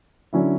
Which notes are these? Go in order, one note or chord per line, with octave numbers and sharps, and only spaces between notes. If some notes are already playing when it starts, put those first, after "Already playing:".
D3 F#3 C#4 E4